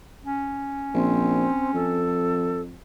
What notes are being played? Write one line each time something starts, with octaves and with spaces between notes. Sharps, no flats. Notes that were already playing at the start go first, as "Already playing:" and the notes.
C#4
A#1 C4
F2 A4